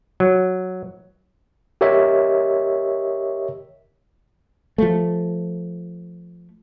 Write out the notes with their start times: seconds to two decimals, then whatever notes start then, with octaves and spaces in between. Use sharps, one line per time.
0.20 F#3
1.81 G4 A#4 C#5 D#5 E5
4.78 F3 A3